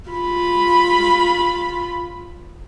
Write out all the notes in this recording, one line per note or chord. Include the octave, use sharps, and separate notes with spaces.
F4 B5